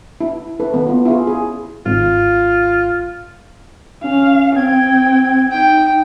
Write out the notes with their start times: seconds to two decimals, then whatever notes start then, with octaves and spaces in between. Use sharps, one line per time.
0.21 E4
0.60 E4 A4 B4
0.73 D#3 B3 B4
0.87 B3 F4
1.06 E4 F4 G#4
1.27 G#4
1.86 G#1 F4
4.04 C#4 F5
4.56 C4 G5 G#6
5.52 D#4 G5